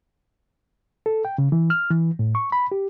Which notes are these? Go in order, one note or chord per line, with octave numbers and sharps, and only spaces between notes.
A4
G5
C#3
E3
F6
E3
A2
C#6
B5
G4